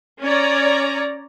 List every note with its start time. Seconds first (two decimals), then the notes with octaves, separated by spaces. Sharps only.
0.23 C#4 C#5 D5 A#5